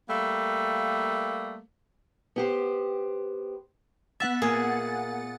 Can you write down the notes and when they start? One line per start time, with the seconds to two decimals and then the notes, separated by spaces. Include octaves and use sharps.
0.09 G3 A3 A#3
2.36 B3 G4 C5
4.20 B3 E5 F#5 A6
4.42 A#2 A#3 G#4